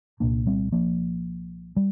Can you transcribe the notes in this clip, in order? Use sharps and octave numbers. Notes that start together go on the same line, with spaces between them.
C2 A#2 A#3 D4
G3 C4
F3 A#3
G3